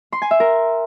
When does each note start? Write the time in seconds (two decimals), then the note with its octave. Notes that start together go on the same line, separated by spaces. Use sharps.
0.13 C6
0.22 G#5
0.31 E5
0.40 A#4